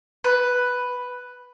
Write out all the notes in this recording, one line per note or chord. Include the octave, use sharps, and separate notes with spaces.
B4